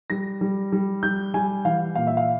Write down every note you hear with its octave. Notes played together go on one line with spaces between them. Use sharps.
G3 A#6
G3
G3
G3 G6
G3 G#5
E3 F5
A#2 F5
E5
F5